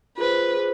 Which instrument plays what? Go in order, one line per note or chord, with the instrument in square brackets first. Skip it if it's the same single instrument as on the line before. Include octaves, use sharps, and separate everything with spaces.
[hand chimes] F4 G#4 C5 [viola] B4
[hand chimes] F4 G#4 C5